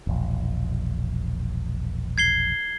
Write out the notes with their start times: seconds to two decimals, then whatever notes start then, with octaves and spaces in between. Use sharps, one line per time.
0.07 E1 A#1
2.18 G#6 C7 G7